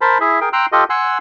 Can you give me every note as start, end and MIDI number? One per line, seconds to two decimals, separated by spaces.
0.01 0.18 70
0.01 0.18 72
0.01 0.18 81
0.01 0.18 83
0.21 0.40 64
0.21 0.40 68
0.21 0.40 76
0.41 0.49 68
0.41 0.49 70
0.41 0.49 79
0.53 0.66 79
0.53 0.66 82
0.53 0.66 84
0.53 0.66 88
0.53 0.66 90
0.72 0.84 65
0.72 0.84 67
0.72 0.84 69
0.72 0.84 75
0.90 1.18 78
0.90 1.18 80
0.90 1.18 84
0.90 1.18 88
0.90 1.18 90